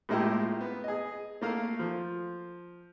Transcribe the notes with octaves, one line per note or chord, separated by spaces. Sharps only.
A2 G#3 A#3 E4 F4 G4
B3
G#4 D#5
A3 A#3 F5
F3